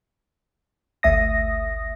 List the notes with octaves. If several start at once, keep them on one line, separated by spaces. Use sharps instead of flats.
G#1 D2 A3 E5 D#6 A#6